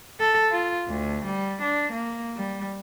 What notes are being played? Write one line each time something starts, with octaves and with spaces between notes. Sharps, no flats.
A4
F4
D2
G3
D4
A#3
G3